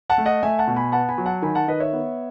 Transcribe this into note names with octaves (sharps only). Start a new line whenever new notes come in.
F#5 A5
A3
D#5 F#5
A3 E5 G#5
F#5 A5
B2
G#5 B5
B3 F#5 A5
G#5 B5
F#3
F#5 A5
D#3 G#5 B5
F#5 A5
D#3 B4 D#5
C#5 E5
B3